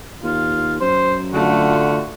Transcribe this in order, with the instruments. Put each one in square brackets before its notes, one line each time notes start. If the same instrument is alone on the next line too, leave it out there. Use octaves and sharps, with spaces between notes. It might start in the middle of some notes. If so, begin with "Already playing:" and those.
[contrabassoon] D#2 [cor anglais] F4
[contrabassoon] F#2 [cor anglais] C5
[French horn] D3 [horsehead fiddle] A3 F4 [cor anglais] F#4